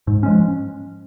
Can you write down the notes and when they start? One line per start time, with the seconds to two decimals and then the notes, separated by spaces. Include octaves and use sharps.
0.07 G#2
0.23 F3 G#3 C#4